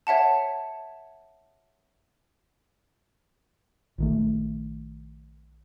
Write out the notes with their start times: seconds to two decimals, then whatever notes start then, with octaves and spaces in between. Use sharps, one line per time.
0.07 C#5 E5 F#5 A5
3.98 A#1 D#3 A3